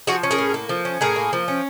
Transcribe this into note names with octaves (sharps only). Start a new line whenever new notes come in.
F3 F#4 G#4
C#4
G#4 A#4
A2
A#3
F3
C#4
A2 G#4 A#4
A#3
F3
C#4